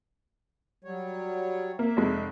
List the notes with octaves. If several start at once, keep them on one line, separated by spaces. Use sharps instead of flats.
F#3 G3 C#5
A#3 E5
F1 G#3